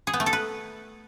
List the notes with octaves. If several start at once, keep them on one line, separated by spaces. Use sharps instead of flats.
G#4
B3
A3
A4
B4